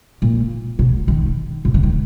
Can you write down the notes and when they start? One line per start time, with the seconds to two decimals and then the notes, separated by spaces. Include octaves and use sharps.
0.22 A#2
0.79 B2
1.08 D#3
1.65 B2
1.74 C#3
1.83 D#3